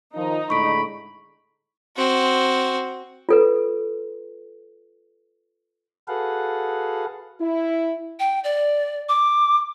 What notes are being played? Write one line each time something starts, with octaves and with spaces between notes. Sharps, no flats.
D#3 F3 D#4
A2 D3 G#3 B5 C#6 D7
C4 F#4
F4 A4 B4
F#4 G#4 A4 B4 F5 F#5
E4
G5
D5
D6